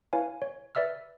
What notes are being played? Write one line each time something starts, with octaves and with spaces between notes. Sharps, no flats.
E4 B4 C#5 F5 G#5
C#5
B4 D5 E5 E6 F6